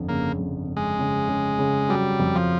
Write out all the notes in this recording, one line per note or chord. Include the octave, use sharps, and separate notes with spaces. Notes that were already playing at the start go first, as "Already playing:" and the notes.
Already playing: G1 F2
C#3 A#3
F2
C#3
G#3
C#3
C#3
C#3
F#3 G3
F2
F3